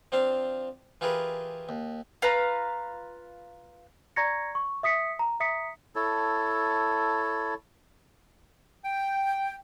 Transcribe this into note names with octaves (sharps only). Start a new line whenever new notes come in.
F3 C4 D4 C5 F5
E3 F4 G4 G#4 A#4 B4
D#2
F4 B4 F5 A#5
D5 A#5 C#6 G#6 A#6 C#7
C#6
E5 D#6 B6 C#7
A#5
E5 A#5 D#6 B6 C#7
E4 A4 C#5 A5
G5